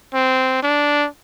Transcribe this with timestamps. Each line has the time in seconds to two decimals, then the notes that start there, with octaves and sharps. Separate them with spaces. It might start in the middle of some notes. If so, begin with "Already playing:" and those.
0.14 C4
0.63 D4